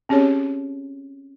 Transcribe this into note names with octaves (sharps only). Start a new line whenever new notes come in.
C4 C#4 G4 G#4 C#5